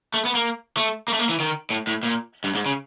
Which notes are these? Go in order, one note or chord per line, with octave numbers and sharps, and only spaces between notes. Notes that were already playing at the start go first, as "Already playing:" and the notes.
A3
B3
A#3
A3
A#3
A3
A#3
E3
D#3
A2
A2
A#2
G2
G#2
C#3